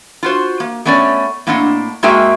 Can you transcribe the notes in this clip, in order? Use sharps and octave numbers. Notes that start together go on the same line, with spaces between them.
F4 F#4 C5
A#3
A3 B3 C#4 C#5 D5
A2 A#3 C4 D4 D#5 F#5
G#3 A#3 F#4 G#4 E5 G5